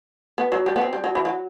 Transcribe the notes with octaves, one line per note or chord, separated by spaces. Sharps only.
B3
F#3
G3
B3
C4
G3
F#3
E3
F#3